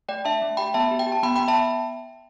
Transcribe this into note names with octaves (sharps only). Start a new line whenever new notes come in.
A3 D5 G5
D4 E5 A5
A3
G4 G5 B5
B3 E5 A5
G4
G5
G4
A5
B3 G5 B5
B3 G5 B5
E5 A5